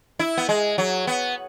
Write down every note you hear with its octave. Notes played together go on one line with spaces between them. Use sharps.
E4
B3
G#3
F#3
B3